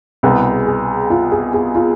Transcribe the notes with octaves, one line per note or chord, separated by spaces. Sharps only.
C2 B2 B3 G#4
G#4
F4
G#4
G#4
F4